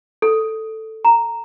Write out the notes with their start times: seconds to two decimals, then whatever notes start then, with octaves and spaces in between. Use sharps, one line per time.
0.22 A4
1.05 A#5